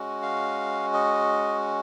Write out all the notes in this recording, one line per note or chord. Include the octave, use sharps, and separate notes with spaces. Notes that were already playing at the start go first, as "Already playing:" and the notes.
Already playing: G#3 C#4 F#4
F5
D#5